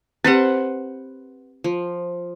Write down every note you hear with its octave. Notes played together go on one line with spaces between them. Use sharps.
C4 G4 B4 C5 F#5
F3